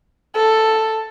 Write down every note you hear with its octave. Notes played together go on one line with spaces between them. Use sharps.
A4